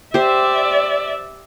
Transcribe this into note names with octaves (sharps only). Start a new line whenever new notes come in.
G4 C5 D5 E5